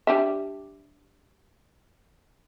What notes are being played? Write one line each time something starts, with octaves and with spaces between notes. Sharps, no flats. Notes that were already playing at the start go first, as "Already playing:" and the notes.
G3 D4 E5